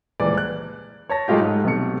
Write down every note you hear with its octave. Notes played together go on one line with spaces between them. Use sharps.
D#1 C#2 E3 D5
F#6
C#5 A5 A#6
G#2 F#3 G#3 A3 F4 G4
G#2 A3
B1 C3 A3 C#7